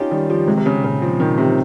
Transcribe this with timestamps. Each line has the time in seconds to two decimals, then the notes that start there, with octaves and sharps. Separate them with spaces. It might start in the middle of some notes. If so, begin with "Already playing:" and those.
Already playing: C#4 D#4 F4 G4
0.11 D#3 G3
0.30 F3 G4
0.47 C3 G#3
0.57 C3
0.66 C#3 G#3
0.84 A#2 C#3
1.02 F3 C4
1.20 A#2 D#3
1.38 C3 C4
1.49 D#3